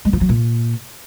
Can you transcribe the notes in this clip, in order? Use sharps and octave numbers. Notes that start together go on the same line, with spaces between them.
G#3
F3
F#3
A#2